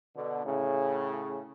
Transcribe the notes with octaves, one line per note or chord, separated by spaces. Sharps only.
B2 D3
A2 C#3